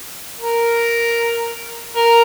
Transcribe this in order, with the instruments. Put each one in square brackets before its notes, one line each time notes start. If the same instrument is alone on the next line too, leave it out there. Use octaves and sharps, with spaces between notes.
[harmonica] A#4
A#4